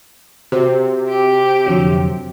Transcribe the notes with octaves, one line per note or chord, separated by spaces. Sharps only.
C3 F#4 C5
G4
F2 D3 F#3